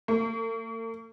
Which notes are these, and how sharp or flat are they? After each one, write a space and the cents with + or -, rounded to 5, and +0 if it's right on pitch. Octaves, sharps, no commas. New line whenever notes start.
A#3 -45